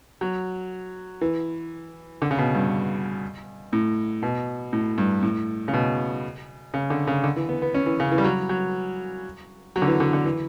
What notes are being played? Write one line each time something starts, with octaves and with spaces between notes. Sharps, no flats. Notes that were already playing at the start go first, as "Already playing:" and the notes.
F#3
E3
D3
C#3
B2
G2
A2
B2
A2
G2
A2
C#3
B2
C#3
D3
C#3
D3
E3
B3
B3
C#4
E3
C#3
E3
G3
F#3
F#3
F#3
D3
E3
D3
D3
E3